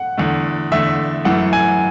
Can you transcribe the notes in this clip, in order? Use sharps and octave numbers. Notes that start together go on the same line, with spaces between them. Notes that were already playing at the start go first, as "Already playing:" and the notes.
Already playing: F#5
E2 D3 A3
E2 D3 A3 E5
F#2 E3 A3 F#5
G#5